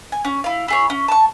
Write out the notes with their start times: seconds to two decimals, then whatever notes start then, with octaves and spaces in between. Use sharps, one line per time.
0.12 G#5
0.25 C#4
0.44 E4 F5
0.68 E4 G#4 C#5
0.90 C#4
1.08 A5 C#6